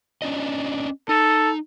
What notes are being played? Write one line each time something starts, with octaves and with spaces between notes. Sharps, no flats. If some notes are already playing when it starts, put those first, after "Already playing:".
C#4 D4 D#5
D#4 A4